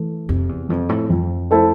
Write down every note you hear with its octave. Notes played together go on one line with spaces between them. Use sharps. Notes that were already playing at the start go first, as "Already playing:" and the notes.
Already playing: E3 A3
F2 C3
E2
F2 F3 C4
A2
F2 F3
A3 E4 A4 C5